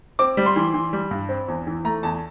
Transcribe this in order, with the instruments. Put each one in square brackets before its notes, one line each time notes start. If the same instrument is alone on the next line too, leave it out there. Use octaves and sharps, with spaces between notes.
[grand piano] C4 D6
G3
C6
E3
E3
G3
G2
C4
E2
E3
A3 A#5
E2 A5